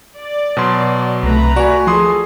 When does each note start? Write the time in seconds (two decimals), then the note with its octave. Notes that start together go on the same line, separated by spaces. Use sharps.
0.18 D5
0.57 B2 F#3 C6
1.23 C2 A3 B4 A#5
1.56 F#4 D5 G#5
1.87 F3 G#4 A4 G#5 C6 D#6